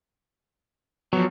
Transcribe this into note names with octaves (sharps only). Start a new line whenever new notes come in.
F3 F#3 B3